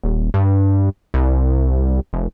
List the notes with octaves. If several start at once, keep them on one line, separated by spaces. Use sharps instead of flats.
D#1
G2
C2
F1